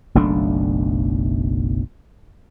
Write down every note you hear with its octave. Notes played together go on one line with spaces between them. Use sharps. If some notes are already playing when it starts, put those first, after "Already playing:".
F#1 B1 A3 D4